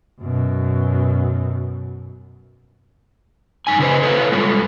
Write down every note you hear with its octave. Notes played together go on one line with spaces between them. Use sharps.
F#2 B2
F#2 D#4 G#5
C#3 D#4 B4 C5 D#5
E4 A4 B4 C#5 E5 F5
G3 G#3 F4 A4